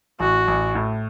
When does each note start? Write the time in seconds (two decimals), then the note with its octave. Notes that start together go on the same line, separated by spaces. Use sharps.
0.20 A1 F#4
0.48 A1
0.75 A2